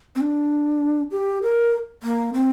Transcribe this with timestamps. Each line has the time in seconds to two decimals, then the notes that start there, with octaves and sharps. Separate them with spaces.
0.16 C4
0.21 D4
1.11 G4
1.43 A#4
2.03 A#3
2.34 C4